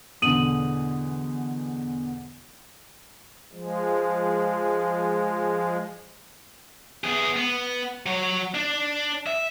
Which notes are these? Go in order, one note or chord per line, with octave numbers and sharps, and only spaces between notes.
E2 B2 D3 D#6 D#7 F#7
F3 G#3
B3 G#4
B3
F#3 C#5
D4
E5